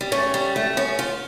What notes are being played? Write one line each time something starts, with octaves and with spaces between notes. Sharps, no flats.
G3
A3 C#4
G3
A3
C#4
F4